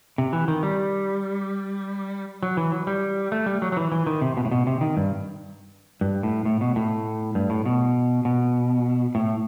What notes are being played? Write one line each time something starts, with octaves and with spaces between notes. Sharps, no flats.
C3
E3
D#3
G3
F#3
E3
F#3
G3
A3
G3
F#3
F#3
E3
E3
D#3
C3
B2
A2
B2
C3
D#3
G2
G2
A2
A2
B2
A2
G2
A2
B2
B2
A2